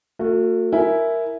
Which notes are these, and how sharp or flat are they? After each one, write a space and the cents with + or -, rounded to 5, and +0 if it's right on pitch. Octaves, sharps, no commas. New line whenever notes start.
A3 +40 F#4 -25
E4 +0 A#4 +0 G#5 +15